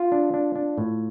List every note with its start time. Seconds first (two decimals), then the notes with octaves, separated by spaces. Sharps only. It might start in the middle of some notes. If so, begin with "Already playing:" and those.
Already playing: F4
0.12 D4
0.34 D4
0.55 D4
0.78 A2